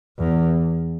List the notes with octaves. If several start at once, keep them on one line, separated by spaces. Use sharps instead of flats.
E2